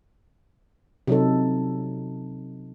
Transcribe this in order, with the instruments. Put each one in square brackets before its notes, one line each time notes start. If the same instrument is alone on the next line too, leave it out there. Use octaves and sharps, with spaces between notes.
[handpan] C3 F#3 D#4 A4